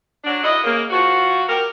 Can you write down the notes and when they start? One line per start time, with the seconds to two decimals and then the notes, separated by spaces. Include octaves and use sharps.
0.24 F#3 D4
0.43 E4 F#4 A4 D#5
0.64 C#3 A#3
0.90 F3 F#4
1.48 G4 A#4